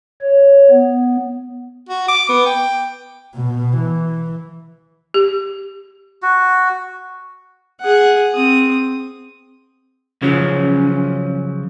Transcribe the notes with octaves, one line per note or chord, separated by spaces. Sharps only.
C#5
B3
F#4
D6
B3
G5
B2
E3
G4
F#4
G#4 F#5
C4 D#6
C#3 F3 F#3 C#4